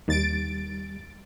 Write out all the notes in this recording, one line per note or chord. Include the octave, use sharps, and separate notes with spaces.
D#2 G3 A6 D7